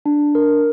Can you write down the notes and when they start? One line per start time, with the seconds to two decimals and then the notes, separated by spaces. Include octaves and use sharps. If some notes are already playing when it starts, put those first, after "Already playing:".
0.06 D4
0.35 A#4